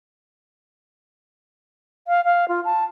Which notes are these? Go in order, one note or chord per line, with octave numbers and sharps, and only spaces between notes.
F5
F5
F4
A5